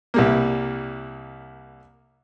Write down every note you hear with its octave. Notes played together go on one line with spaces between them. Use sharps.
C2 G3 A#3